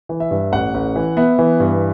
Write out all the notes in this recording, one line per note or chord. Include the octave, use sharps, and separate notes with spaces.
E3
E5
G2
A1 F#5
A1
E3
B3 E5
E3
G2